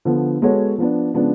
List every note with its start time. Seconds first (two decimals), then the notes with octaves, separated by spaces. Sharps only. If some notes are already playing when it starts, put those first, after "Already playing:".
0.05 D3 F3 B3
0.42 G#3 B3 F#4 A4 C#5
0.78 F3 B3 D4
1.14 C#3 F3 G#3 B3 D4